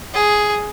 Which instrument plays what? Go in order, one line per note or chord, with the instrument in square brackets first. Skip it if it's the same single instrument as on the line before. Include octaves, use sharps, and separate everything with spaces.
[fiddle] G#4